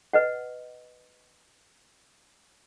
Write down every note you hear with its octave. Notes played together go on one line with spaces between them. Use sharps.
B4 D#5 F#5